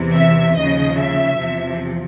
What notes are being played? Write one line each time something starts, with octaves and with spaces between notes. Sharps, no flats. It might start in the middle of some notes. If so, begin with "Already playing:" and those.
Already playing: E2 C3 E3
E5
D#2 C#3 F3 D#5
E5
E2 C3 F3